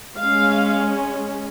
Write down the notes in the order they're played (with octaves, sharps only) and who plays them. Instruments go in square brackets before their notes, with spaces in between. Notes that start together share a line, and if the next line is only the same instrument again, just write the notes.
[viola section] G#3 C#4 F5